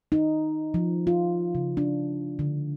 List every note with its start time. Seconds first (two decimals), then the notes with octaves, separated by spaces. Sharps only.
0.12 D#4
0.74 F3
1.07 F4
1.55 C#3
1.77 D4
2.39 D3